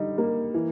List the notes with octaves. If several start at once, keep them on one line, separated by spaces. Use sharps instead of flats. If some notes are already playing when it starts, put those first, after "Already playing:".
Already playing: D3 G3 D#4
A#3
E3